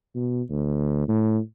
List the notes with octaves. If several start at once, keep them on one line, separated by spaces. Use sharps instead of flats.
B2
D2
A2